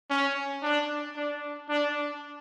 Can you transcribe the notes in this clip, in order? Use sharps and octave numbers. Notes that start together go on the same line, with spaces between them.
C#4
D4
D4
D4